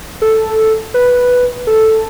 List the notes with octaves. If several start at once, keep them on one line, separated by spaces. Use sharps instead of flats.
A4
B4
A4